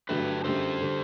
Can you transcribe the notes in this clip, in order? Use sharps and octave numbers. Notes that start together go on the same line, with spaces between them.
G2 D3 F#3 A3 D4 G4 B4
F#2 D3 G3 A4 C5
D3 G3